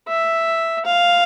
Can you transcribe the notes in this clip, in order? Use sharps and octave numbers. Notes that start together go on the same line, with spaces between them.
E5
F5